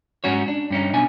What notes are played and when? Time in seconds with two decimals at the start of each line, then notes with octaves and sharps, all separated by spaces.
0.24 G#2 C#4 F#4 C#5
0.48 D4
0.70 G2 C#4 D#4
0.94 B2 D4 G#5